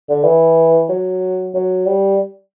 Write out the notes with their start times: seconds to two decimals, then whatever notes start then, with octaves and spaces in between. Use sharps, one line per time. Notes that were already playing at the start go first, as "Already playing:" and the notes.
0.09 D3
0.24 E3
0.89 F#3
1.54 F#3
1.86 G3